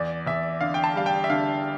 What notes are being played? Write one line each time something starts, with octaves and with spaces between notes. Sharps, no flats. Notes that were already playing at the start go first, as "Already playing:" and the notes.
Already playing: E2 D5
E2 E5
D3 F5
G5
A5
G3 F5
G5
E5
D3 F5